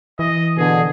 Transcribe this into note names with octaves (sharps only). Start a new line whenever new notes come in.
E3 D#5
B2 D3 G#4